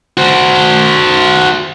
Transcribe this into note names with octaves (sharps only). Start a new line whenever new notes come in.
F#4 C5